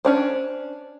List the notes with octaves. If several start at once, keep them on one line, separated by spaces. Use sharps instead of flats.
C#4 D4 C5